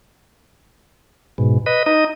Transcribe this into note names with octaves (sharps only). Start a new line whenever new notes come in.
G#2 B2
B4 D#5
D#4 D#5